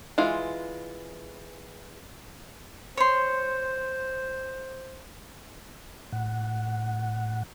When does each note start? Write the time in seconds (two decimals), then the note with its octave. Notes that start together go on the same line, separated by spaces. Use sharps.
0.18 E3 G#3 F4
2.97 C5 C#5 C6
6.13 A2 F#5